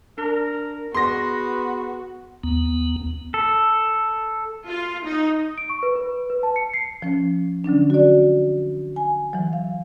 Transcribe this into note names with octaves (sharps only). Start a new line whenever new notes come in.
D4 A#4
B3 F#4 G#4 C6 A#6
D#2 B3
A4
F4
D#4
D7
C#6
B4
B4
B4
A5
C#7
C7
F3 C#4
D3 F#3 C#4 D4
F#4 D5
G#5
E3 F#3
F5